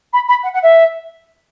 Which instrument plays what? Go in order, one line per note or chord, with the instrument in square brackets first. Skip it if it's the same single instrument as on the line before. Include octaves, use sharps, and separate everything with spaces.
[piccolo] B5
B5
F#5
F#5
E5